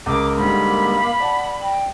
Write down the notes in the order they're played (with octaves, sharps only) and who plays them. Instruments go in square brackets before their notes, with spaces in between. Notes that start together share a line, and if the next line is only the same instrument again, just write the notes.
[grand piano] C#2 A#4 [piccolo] D6
[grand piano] G#2 D3 G3 [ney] A#3 [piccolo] B5
[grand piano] F5
[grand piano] D5 A5 [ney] F#5
[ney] G5